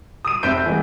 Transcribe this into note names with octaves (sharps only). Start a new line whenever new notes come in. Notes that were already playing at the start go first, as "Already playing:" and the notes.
D#6 D#7
F1 C4 C5 E5 G6 D7
E3 G#3 B3